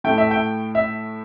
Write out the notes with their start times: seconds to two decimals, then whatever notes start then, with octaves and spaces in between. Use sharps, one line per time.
0.04 A2 A3 E4 G5
0.18 E5
0.31 G5
0.75 E5